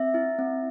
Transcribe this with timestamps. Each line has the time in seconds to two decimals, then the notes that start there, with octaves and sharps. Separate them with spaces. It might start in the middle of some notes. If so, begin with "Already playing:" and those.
Already playing: C4 E5
0.14 E4
0.39 C4